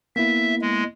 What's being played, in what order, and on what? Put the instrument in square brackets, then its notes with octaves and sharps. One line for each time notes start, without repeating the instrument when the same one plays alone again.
[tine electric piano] A#3 B3 E4 [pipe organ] E5
[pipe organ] G#3